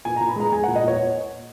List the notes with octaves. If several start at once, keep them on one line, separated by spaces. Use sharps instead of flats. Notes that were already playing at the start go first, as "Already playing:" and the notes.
A#2 G#5
A#2 A#5
B5
G#3 A#5
G#3 G#5
A#2 F#5
D#5
A#2 C#5